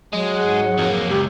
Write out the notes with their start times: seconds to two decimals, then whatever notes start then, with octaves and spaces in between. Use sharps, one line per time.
0.13 F#3 G#3
0.36 G#2 G#4 F#5
0.78 F2 A#3
1.09 C#2 F#2 G4